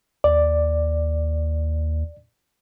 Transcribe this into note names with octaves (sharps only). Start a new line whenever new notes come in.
D#2 D5